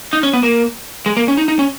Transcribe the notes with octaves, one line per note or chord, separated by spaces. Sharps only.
D#4
C#4
B3
A#3
G#3
A#3
C#4
D#4
D#4
C#4